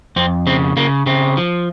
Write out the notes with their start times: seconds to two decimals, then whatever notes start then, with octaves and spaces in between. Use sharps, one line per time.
0.16 F2 C4
0.47 C#3 C4
0.77 C#3 A#3
1.06 C#3 C4
1.37 F3